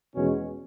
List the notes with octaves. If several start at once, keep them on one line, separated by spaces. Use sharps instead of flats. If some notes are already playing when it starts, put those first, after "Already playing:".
E2 B2 G#3 C#4